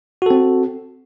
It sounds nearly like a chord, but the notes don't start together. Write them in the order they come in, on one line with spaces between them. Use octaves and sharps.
F#4 A4 C4